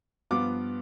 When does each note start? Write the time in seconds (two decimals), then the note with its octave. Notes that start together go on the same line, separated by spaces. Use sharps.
0.31 G2 F3 B3 F4 D6